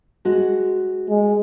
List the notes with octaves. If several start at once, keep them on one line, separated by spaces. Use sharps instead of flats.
G#3 F#4
G#3